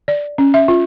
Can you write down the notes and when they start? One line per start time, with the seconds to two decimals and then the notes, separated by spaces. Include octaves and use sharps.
0.08 D5
0.38 C#4
0.54 E5
0.68 F4